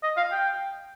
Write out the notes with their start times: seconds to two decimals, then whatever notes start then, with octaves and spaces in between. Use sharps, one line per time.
0.03 D#5
0.17 F5
0.32 G5